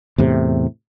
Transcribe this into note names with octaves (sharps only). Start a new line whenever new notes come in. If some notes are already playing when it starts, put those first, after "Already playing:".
E2 A2 C3